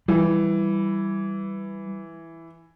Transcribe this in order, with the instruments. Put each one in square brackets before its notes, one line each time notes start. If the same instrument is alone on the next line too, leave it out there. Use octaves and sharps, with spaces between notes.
[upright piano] E3 [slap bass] G3